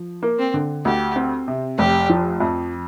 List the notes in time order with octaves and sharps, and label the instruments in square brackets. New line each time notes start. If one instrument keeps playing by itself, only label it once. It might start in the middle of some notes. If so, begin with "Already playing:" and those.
Already playing: [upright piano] F3
A#3
[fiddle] C4
[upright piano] D3
[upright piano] D2 [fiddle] G4
[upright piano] C4
C3
[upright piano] F1 [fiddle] G4
[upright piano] F3
F2